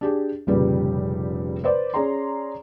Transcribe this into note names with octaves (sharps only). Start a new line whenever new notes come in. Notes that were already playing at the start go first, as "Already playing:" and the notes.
D4 G4 G#4
F1 A#2 C#3 G3 G4 B4
B4 C5 D5
C#4 G#4 D5 A#5 C6